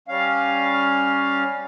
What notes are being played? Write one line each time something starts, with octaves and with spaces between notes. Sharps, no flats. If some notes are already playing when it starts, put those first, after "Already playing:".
G3 C#4 F5